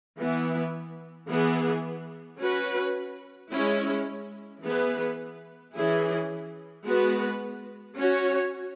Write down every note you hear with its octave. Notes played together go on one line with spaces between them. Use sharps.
E3 B3 E4
E3 B3 G#4
C#4 F#4 B4
G#3 C#4 E4
E3 B3 G#4 B4
E3 C#4 E4 G#4
G#3 B3 F#4 B4
C#4 F#4 C#5